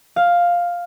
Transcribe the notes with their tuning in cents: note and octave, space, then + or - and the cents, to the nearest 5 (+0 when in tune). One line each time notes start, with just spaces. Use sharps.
F5 +5